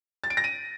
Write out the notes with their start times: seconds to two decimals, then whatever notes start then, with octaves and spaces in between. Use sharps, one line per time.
0.24 A6
0.30 D7
0.37 A#6
0.44 D#7